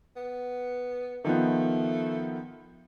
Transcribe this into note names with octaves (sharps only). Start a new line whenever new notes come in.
B3
D#3 F3 A3 B3